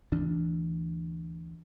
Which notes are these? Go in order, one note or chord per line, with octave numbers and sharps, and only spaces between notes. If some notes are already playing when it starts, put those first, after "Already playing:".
D2 E3 D4